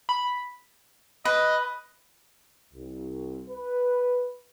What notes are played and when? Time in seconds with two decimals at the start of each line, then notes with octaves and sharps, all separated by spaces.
0.09 B5
1.25 B4 D#5
2.74 C2
3.50 B4